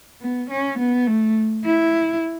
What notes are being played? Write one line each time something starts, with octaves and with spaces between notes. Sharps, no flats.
B3
C#4
B3
A3
E4